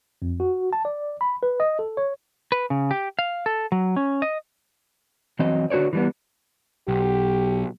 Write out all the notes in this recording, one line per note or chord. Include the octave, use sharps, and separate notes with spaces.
F2
F#4
A5
D5
B5
B4
D#5
A4
C#5
B4
C#3
G4
F5
A4
F#3
C#4
D#5
E3 F#3 C4 D#5
D3 F#4 B4 C#5 D5
E3 G3 B3
B1 G4